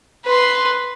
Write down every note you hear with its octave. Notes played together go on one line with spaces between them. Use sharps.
B4 C6